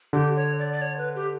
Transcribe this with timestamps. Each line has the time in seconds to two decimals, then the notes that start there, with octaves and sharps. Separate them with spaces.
0.13 D3 G4
0.36 C#5
0.59 D5
0.73 D5
0.81 C#5
0.98 B4
1.15 G4